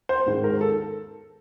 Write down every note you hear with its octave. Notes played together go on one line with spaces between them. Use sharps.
C5
G#2 D#3 G#3
A#4
A4